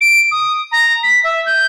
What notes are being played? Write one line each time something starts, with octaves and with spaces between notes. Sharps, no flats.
D7
D#6
A#5
B6
E5
G6